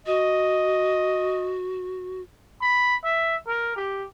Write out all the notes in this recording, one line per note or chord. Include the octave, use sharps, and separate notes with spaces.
F#4 D#5
B5
E5
A#4
G4